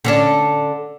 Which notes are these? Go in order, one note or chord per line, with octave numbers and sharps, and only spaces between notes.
D3 C#4 D4